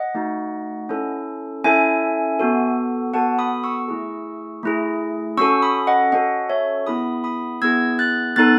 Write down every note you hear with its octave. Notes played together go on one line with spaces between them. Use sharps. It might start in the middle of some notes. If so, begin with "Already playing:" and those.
Already playing: D#5 F#5
A3 D#4 F#4
C#4 E4 A4
C#4 E4 A4 E5 G#5
B3 F#4 A4
B3 F#4 A4 F#5 A5
B5 D#6
C#6 E6
A3 E4 G#4
A3 E4 G#4
C#4 F#4 A4 C#6 E6
B5 D#6
D#5 F#5
C#4 F#4 A4 D#5 F#5
C#5 E5
B3 E4 G#4 B5 D#6
B5 D#6
B3 E4 G#4 E6 G#6
F#6 A6
B3 D#4 A4 F#6 A6